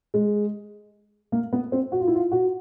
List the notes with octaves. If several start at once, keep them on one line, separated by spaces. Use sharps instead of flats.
G#3
A#3
B3
C4
F#4
F4
E4
F4
F#4